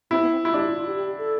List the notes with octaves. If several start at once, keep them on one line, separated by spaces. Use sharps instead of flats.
C4 E4
B3
C4
E4 F4
D4 G4
F4
F4
G4
G4
A4